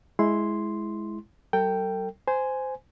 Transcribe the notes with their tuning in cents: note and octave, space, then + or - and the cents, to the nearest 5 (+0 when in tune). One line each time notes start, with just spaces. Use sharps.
G#3 +10 E4 +0 C6 +0
G3 -45 A4 +45 G5 +0
C5 -15 G#5 +0